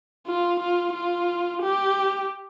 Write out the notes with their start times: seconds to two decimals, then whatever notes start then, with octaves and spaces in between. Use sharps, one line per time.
0.27 F4
0.60 F4
0.94 F4
1.62 G4